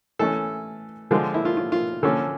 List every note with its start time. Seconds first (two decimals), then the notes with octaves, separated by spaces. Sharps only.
0.19 E3 A3 C#4 A4
1.11 D3 F3 G#3 F4
1.34 E4
1.45 F4
1.57 F4
1.72 F4
2.03 D3 F3 A#3 C#4 A4